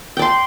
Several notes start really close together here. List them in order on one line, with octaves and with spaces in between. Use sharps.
G5 D5 C6